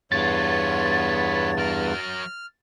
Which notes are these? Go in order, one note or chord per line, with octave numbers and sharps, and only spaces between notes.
E2 G2 B3 F4 C#5 A6
F#3 A#4 F6